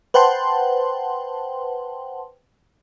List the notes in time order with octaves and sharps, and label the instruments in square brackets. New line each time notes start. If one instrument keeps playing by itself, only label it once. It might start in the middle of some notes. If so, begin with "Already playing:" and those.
[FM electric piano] B4 C5 F#5 G5 A5 C6